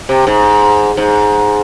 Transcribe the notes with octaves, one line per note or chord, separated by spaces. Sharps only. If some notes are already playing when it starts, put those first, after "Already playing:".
C3
G#2
G#2